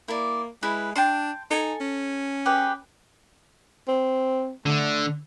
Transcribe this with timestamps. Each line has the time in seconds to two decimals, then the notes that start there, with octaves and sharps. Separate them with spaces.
0.08 A#3 E4 D5
0.63 G#3 E4 B4
0.95 D4 G5 A5 C6
1.51 D#4 A4 G#5
1.81 C#4
2.46 G4 G#4 B4
3.88 C4
4.66 D3 A3